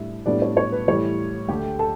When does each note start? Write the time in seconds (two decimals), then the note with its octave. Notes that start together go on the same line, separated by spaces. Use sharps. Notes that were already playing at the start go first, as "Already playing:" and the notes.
Already playing: A2 G3 D4 E4 E5
0.26 A2 G3 B3 D4 D5
0.42 C#5
0.57 C#5
0.72 B4
0.87 A2 E3 G3 C#5
1.48 D2 D3 A3 G4 G5
1.79 A4 A5